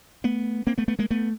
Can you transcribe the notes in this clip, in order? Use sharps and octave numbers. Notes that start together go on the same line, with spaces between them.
A3 B3
A#3 C4
A3 B3
A3 B3
G#3 A#3
A3 B3